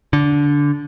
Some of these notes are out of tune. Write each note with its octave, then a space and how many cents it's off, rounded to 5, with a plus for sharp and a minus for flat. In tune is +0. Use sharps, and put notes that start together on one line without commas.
D3 -15